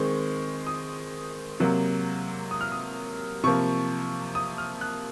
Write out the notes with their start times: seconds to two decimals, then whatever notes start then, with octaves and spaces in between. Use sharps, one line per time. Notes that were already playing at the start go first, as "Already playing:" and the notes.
Already playing: D#3 G#3 C4 C#6
0.67 D#6
1.60 C3 F#3 A#3
2.51 D#6
2.61 F6
2.72 D#6
3.44 C3 F3 A#3 C#6
4.35 D#6
4.58 F6
4.81 F#6